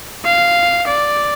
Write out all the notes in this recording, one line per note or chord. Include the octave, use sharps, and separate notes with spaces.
F5
D5